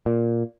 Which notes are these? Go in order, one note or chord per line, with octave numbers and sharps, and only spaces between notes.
A#2